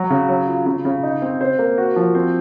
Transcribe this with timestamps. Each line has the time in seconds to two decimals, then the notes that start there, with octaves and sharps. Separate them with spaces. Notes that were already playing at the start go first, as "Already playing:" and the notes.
Already playing: F#3 F#4
0.10 C#3
0.29 F#3
0.48 F4
0.66 C#3
0.85 C#3
1.03 D#4
1.22 C4
1.41 C5
1.59 A#3
1.78 F#4
1.96 F3
2.15 C4